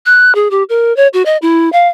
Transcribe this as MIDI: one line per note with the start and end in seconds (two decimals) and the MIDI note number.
0.06 0.34 90
0.35 0.48 68
0.51 0.63 67
0.69 0.95 70
0.96 1.08 73
1.13 1.23 66
1.26 1.37 75
1.42 1.71 64
1.72 1.88 77